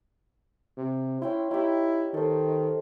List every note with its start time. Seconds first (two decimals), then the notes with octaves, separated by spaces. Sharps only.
0.78 C3
1.22 C#4 E4 G5 C6
1.51 D#4 E4 G4
2.14 D#3 A4 C5